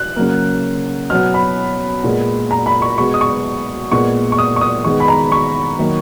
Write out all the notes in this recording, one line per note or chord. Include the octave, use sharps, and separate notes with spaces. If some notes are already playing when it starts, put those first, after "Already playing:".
Already playing: F#6
C#3 F#3 A#3
B2 F#3 B3 F6
B5
A#2 G#3 B3
A#5
B5
C#6
B2 G#3 B3 C#6
D#6
C#6
A#2 G#3 B3 C#6
C#6
D#6
C#6
D#6
D#3 G#3 B3 C#6
B5
A#5
C#6
D#3 F#3 A#3